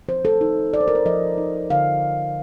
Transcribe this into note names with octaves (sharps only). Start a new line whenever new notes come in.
F3 C5
A4
D#4
D#4 D5
C5
A#4
C5
F3 D#5
D#4
D3 F5